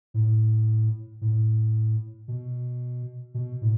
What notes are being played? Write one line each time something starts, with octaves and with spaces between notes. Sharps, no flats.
A2
A2
B2
B2
A2